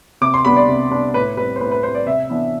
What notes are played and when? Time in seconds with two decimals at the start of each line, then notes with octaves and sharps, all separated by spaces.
0.21 C3 D6
0.34 C6
0.45 G3 B3 D4 B5
0.56 D5
0.69 C3
0.91 G3 B3 D4
1.14 A2 B4
1.37 G3 B4
1.41 C4
1.56 C5
1.60 A2 B4
1.71 B4
1.83 G3 C4 C5
1.95 D5
2.06 C3 E5
2.29 E3 B3 D4